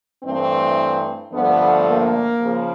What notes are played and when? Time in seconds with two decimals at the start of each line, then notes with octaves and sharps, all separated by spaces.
0.23 G2 E3 A3 C4
1.31 G2 D3 F3 A3 B3
1.86 A#3
2.40 C#3 F3